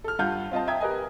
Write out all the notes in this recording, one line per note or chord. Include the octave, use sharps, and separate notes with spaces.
A4 F6
G2 F4 F#5 F6 G6
C4 F4 D#5 A5
E5 G5 A#5 D#6 G#6
G4 A#4 B4 D#5 G#5